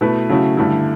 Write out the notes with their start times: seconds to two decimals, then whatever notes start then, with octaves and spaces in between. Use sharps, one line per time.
0.01 B2 A3 E4 B4
0.29 C#3 F#3 A3 C#4 E4
0.57 G2 D3 A3 E4